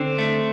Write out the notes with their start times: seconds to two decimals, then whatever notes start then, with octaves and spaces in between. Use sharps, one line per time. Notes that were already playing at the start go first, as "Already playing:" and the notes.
Already playing: D3 C4
0.18 A3